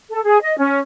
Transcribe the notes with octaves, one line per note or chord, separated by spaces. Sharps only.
A4
G#4
D#5
C#4